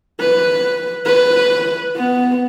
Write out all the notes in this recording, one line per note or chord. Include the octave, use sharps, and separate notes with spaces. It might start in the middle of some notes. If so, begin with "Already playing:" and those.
B4
B4
B3